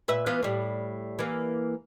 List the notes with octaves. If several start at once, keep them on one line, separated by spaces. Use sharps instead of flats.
A#2 B4 E5
E3 B3 F4
A2 G3
E3 A#3